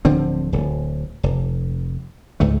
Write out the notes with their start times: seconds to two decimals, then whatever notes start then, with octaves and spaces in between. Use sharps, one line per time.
0.05 D1 D3 F3 C4
0.53 D1
1.23 F1
2.40 C#2 G#2 A3